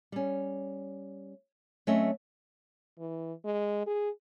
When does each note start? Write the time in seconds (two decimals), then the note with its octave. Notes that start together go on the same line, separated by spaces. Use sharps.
0.12 G3 C#4
1.87 F#3 A3 C4 C#4 D#5 E5
2.99 E3
3.45 G#3
3.86 G#4